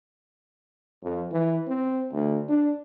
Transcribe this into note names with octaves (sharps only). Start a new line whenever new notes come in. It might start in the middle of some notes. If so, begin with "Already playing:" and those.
F2
E3
C4
D2
D4